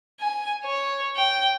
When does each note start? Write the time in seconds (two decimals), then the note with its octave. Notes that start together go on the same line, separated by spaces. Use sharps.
0.20 G#5
0.65 C#5
1.16 G5